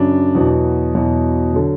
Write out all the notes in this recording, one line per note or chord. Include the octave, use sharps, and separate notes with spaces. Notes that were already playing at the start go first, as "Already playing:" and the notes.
Already playing: F#2 C#3 F#3 D4
E2 B2 F#3
E2 B2 F#3
D3 F#3